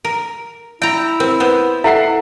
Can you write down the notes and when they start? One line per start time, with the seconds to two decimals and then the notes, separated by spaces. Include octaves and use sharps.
0.05 A#4
0.82 E4 E5 G5 A#5
1.20 C4 A#4
1.40 B3 C5
1.84 E4 A4 E5 F#5 C7